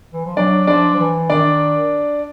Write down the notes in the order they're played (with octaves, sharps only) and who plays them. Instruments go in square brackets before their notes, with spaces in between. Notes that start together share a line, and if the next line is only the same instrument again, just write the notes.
[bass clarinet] E3
F3
[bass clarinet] F#3 [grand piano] D4 D5
[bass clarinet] F3 [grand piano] D4 D5
[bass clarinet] F3
E3
[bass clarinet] D#3 [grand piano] D4 D5